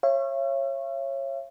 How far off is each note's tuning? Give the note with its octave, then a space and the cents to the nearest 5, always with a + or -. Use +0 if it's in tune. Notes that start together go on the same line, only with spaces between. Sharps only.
C#5 -20 E5 +45